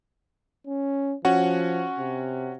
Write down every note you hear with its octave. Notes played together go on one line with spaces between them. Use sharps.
C#4
F3 C#4 F#4 F#5
C3